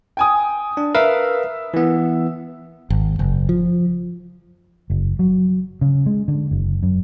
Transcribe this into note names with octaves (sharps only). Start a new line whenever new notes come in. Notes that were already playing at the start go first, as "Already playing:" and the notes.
G5 G#5 D#6
D4
A#4 B4 E5 F5
E3 B3
G#1
F#1
F3
F#1
F#3
C#3
G#3
D3
F#1
F#2